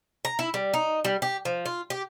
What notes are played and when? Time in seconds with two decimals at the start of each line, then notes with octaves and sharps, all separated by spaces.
0.25 A#5
0.39 E4
0.54 G3
0.74 D#4
1.05 G3
1.22 G4
1.45 F3
1.66 F4
1.90 G4